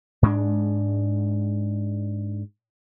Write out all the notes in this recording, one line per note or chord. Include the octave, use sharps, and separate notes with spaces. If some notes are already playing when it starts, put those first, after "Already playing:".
G#2 G#3 A3 D4